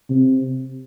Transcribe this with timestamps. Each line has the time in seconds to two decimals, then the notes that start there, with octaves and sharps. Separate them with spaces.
0.10 C3